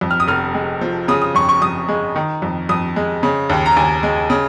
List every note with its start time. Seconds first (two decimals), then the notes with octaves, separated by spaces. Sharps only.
0.01 F2
0.11 F6
0.20 D#6
0.28 F1 F6
0.54 G#3
0.81 F3
1.08 C#3 D#6
1.22 D#6
1.35 F2 C#6
1.49 C#6
1.62 F2 D#6
1.88 G#3
2.16 D#3
2.42 F2
2.69 F2 D#6
2.96 G#3
3.23 C#3
3.50 D#2
3.66 A#5
3.77 D#2 G#5
4.03 G#3
4.30 C#3